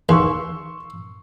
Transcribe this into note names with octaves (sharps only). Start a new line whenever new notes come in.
D#2 C6 C#6 E6